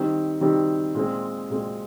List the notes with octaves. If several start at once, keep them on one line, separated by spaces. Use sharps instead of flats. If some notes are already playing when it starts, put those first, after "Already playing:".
Already playing: D#3 G3 C4 G4
D#3 G3 C4 G4
A#2 G#3 C4
A#2 G#3 C4